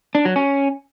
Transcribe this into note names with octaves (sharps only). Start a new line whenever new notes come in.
D4
F#3
C#4